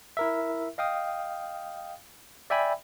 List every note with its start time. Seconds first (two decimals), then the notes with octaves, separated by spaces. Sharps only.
0.17 E4 A#4 E5
0.78 D#5 F5 G5 D#6
2.50 D5 E5 G5 G#5 B5